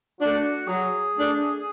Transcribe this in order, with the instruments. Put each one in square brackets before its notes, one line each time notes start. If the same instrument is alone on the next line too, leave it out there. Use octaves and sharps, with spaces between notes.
[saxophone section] A3 D4 [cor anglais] F#4
[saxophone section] F#3 [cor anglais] G#4
[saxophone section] A3 D4